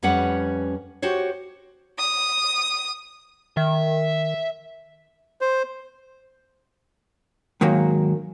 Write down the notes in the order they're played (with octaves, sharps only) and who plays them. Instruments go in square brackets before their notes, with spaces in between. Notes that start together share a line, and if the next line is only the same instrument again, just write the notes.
[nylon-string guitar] F2 G3 C#4 B4 F#5
F#4 G4 C5 C#5
[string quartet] D#6
[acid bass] D#3 [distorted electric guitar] E5
[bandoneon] C5
[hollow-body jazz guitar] G#2 D#3 F#3 A#3